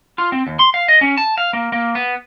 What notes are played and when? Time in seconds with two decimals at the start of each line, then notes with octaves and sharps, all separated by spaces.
0.18 F4
0.32 C4
0.47 D#2
0.59 C6
0.74 F5
0.88 D#5
1.01 C#4
1.18 A5
1.38 F5
1.53 A#3
1.72 A#3
1.95 B3